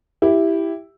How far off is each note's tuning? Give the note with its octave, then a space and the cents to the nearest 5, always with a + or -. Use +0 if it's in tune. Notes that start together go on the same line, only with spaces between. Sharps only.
E4 +0 G4 +0